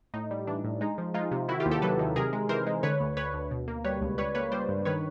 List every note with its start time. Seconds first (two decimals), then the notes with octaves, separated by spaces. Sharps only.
0.14 A2 D#4
0.31 G3
0.47 E3 D4
0.64 A2
0.81 G#3 D#4
0.98 F3
1.14 G#3 D#4 F4
1.31 C3
1.48 D#3 E4 F#4
1.60 F4 G4
1.66 D#2
1.71 G4 A4
1.82 F#3 A4 B4
1.99 D#3
2.16 C3 G#4 A#4
2.33 G#3
2.49 E3 A#4 C5
2.67 G#3
2.83 D3 B4 C#5
3.00 D2
3.17 D2 B4 C#5
3.33 D2
3.51 B2
3.68 A#3
3.84 G3 B4 C#5
4.01 C#2
4.18 G3 B4 C#5
4.35 A#3 B4 C#5
4.52 G3 C5 D5
4.69 G2
4.85 D#3 B4 C#5